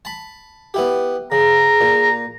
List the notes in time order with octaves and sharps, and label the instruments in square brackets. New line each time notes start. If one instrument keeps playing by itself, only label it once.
[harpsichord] A5 B5
B3 E4 G4
[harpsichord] C#3 [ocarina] G#4 [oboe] A#5
[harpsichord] A#2